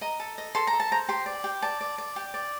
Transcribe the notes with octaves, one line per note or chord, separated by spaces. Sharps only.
D#5 A#5
A4
D#5
A4 C6
A#5
A4
A5
C5 A#5
G4 C6
D5
G4
D5 A5
D5
D5
G4
D5